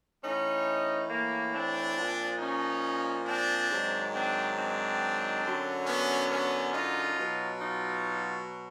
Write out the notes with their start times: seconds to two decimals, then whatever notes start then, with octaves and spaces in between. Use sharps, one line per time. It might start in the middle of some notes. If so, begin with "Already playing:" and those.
0.23 A2 E3 C#4 D#4
1.09 A#3
1.53 C4 D4
1.96 A#2 F3
2.39 C#4 D#4
3.26 C4 D4
3.70 G#2 D#3 F#3
4.13 C4 D4
4.57 C4 D4
5.43 F#2 D3 F#3
5.87 B3 C#4
6.30 B3 C#4
6.73 D#4 F4
7.17 B2 F#3
7.60 D#4 F4